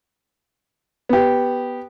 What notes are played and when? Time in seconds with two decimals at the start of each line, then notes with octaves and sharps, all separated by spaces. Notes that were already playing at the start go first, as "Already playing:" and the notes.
1.09 B3 G4